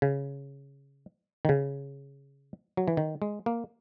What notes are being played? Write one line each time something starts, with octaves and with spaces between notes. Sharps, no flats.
C#3
D#3
C#3
F#3
E3
D#3
G#3
A#3